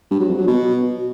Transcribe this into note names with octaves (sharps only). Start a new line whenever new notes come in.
G2
F#3
F2
F#3
B2